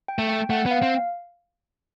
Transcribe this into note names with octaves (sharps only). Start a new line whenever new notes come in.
G5
A3
G5
A3 F#5
B3
F5
C4